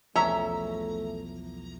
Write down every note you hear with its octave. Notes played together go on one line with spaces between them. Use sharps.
B1 E2 F3 A3 C#4 E5 A#5